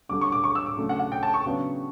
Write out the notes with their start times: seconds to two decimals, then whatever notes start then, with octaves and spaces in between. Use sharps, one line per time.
0.09 D3 G3 D4 D6
0.21 C#6
0.32 D6
0.44 C#6
0.55 E6
0.66 D6
0.77 C#3 F#3 A3 D4
0.89 F#5
0.99 F#5
1.12 G5
1.23 A5
1.34 C#6
1.46 C#3 F#3 B3 D4